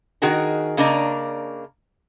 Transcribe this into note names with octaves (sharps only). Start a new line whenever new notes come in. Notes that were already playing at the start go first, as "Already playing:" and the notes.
D#3 D#4 F#4 G#4 A#4
C#3 A#3 D4 D5 D#5 A#5